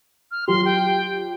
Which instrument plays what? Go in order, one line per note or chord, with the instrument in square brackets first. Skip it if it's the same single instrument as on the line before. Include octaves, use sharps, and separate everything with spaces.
[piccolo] F6
[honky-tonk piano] F#3 F4 G4 [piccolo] C6
[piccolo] G5